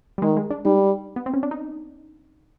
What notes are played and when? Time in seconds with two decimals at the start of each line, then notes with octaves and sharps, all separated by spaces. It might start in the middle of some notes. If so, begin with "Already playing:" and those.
0.18 G3
0.22 D#3 G#3
0.37 G#3
0.51 D4
0.65 G3 D#4
1.16 B3
1.26 C4
1.34 C#4
1.43 D4
1.51 D#4